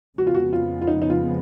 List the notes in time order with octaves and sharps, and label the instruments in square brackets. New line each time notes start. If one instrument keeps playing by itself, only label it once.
[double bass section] F2 C#3 F3 G#3 B3 [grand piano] F#4
[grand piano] F4
F#4
F4
F4
D#4
D#4
F4